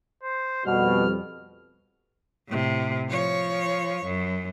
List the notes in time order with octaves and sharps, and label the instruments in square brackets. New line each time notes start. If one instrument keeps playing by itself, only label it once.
[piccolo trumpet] C5
[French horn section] F2 G3 [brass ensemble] B2 [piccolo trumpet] F6
[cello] A2 C3
F3 C#5
F#2